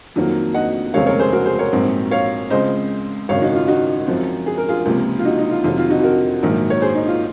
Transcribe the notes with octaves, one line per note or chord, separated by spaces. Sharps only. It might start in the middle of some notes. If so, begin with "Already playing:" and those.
F2 D#3 F#3 A#3
D#5 F#5
F1 D#2 C#3 G#3 C4 C#5 F5
A#4 C#5
G#4 C5
F#4 A#4
G#4 C5
A#4 C#5
A#1 G#2 F#3 C4
C#5 F5
C#2 C#3 G#3 C4 C5 D#5
G#1 F#2 C#3 C#5 F5
D#4 F#4
F4
D#4 F#4
F#2 F3 C4
G#4
A#4
F4 G#4
C#2 C3 F3 A#3
F4
D#4 F#4
D#4
F4
F2 C3 D#3 F#3 F4
F4
D#4 F#4
F#4 A#4
A#1 G#2 D#3 F#3 A#3
C#5
G#4 C5
D#4
F4